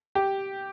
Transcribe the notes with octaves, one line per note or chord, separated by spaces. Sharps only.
G4